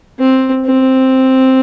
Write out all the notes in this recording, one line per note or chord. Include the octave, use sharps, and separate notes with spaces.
C4
C4